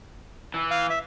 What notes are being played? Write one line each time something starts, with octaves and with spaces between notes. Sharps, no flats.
E3
F5
E5